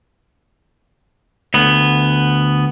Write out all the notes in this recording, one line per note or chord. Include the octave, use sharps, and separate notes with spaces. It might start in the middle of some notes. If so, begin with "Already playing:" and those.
D2 B3